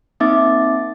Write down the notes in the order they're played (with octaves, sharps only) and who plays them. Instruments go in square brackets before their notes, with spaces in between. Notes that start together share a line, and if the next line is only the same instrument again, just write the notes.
[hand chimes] A#3 C4 D#4 E5 D6 A6